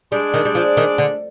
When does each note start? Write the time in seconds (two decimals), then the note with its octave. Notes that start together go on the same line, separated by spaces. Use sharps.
0.12 G3 G#3 D4 G#4 D5
0.34 D#3
0.45 G3
0.55 F3
0.77 D#3
0.98 D3